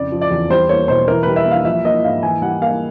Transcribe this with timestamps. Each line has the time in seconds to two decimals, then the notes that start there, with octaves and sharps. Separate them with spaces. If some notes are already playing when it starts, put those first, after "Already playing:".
Already playing: F2 C#3 D5
0.12 F3
0.21 D5
0.31 E2
0.50 G3 C5
0.69 A#3 C#5
0.88 B2 C5
1.08 E3 A#4
1.23 G3 B4
1.36 E5
1.46 A#3
1.51 F5
1.65 F3 E5
1.84 A#3 D#5
2.04 G#2 F5
2.23 E3 G#5
2.42 G3 F#5
2.62 A#3 F5